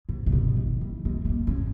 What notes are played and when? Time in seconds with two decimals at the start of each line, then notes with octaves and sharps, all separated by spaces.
0.09 G#2
0.26 A#2
0.32 B2
0.56 D#3
0.81 E3
1.05 G#3
1.25 G#3
1.29 A#3
1.47 C#4